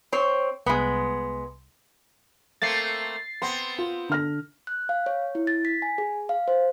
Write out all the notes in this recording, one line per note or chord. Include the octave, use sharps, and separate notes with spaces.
C4 C#5
C2 G#3 B3
A3 A#3 C4 A6 C7
B3 C4 C6
F4
D3 F6 A#6
F#6
F5
C#5
E4
A6
B6
G#5
G#4
F5
C5